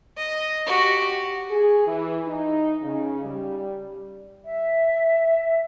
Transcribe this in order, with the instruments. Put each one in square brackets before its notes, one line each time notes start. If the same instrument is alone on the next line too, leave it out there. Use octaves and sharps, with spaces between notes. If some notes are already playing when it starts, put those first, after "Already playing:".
[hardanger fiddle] D#5
F#4 G4
[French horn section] G#4
E3
D#4
C#3
G3
[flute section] E5